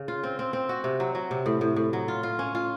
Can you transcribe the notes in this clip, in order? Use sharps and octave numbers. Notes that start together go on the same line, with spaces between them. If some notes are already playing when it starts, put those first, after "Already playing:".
Already playing: C#3
F4
C4
C4
C4
F#4
C3
F#3
F#3
C3
A2
A2
A2
F#3
F4
F4
C#4
F4